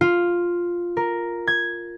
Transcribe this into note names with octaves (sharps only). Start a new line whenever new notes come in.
F4
A#4
G#6